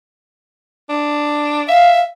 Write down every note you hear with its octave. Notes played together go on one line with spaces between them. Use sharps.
D4
E5 F5